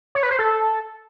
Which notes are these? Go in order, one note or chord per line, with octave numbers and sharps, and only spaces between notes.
C#5
B4
C5
A4